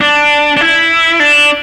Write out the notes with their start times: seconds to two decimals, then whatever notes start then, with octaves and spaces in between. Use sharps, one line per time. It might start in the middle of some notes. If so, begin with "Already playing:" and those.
0.01 D4
0.57 D4
0.61 E4
1.20 D4